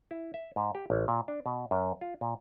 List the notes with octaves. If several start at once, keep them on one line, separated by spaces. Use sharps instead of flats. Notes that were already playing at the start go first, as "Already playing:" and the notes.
E4
E5
G#2
G4
A1
A#2
D4
B2
F#2
F4
A#2